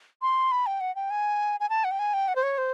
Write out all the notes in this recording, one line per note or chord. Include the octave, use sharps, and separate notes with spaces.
C6
B5
G5
F#5
G5
G#5
G#5
A5
F#5
G5
G#5
G5
F#5
C5
C#5
C5